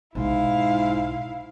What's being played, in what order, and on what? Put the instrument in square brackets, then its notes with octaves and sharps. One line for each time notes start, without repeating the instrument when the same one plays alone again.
[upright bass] B1 [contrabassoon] G#2 [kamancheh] E4 F5